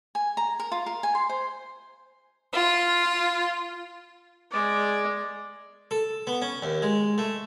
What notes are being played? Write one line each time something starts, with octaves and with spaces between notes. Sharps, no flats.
G#5
A#5
A#4
F4
A#4
G#5
C6
C5
F4
G#3 D5
A4
B3
C#4
D#2
G#3
A3